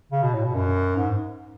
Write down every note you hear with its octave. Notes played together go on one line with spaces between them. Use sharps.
C#3
B2
A2
B2
F#2
G#2